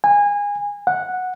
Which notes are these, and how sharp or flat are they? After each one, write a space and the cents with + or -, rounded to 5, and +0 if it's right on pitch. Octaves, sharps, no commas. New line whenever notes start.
G#5 -25
F#5 -10